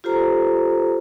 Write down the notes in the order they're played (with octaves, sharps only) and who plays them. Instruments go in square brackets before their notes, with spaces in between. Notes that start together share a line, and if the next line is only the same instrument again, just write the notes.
[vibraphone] F4 G4 A4 C5 A#5